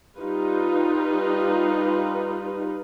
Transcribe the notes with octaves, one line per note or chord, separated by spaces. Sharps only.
G3 D#4 F4 B4